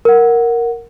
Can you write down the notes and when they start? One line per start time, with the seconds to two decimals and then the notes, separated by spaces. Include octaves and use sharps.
0.05 A#4 F#5